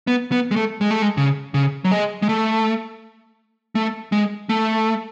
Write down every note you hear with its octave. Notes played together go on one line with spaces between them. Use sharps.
B3
B3
G#3
A3
G#3
A3
G#3
C#3
C#3
F#3
G#3
G#3
A3
A3
G#3
A3